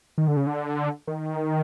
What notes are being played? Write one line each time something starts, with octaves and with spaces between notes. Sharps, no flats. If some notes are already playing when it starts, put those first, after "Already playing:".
D#3
D3
C#3
D3
D#3